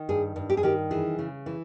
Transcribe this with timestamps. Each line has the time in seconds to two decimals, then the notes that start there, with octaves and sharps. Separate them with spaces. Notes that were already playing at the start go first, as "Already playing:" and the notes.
Already playing: D#3
0.09 G2 G#4
0.36 G2
0.50 G4
0.57 G#4
0.63 D#3 G4
0.91 E3 G#4
1.19 C#3
1.46 E3